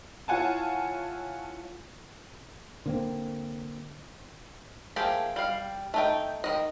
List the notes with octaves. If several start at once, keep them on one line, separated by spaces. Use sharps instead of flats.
E4 F4 C#5 F#5 G#5 A5
D3 A#3 C4
F3 A3 A#3 G4 G#4
G3 F5
A3 D#4 G5
D#3 D#5